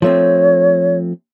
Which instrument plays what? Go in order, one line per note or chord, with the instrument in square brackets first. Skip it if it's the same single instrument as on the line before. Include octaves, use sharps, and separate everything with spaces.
[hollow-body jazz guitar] F3 A3 C4 [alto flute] C#5